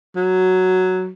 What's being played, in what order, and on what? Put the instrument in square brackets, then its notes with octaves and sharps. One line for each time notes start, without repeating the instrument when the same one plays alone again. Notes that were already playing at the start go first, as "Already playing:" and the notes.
[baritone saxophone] F#3